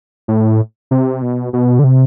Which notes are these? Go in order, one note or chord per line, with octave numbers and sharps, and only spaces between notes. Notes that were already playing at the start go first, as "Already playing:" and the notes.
A2
C3
B2
B2
D3
C3